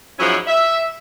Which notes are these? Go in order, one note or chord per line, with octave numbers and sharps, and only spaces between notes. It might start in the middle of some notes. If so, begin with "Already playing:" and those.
G#2 F3 F#3 C#4 E4
E5